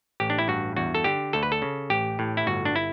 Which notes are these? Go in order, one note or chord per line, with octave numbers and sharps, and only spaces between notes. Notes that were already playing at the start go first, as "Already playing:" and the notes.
A1 G4
D4
E4
G2 F#4
E2 F#4
A4
D3 G4
D2 A4
B4
A4
C#3
A1 G4
A2
E4
G1 F#4
D4
E4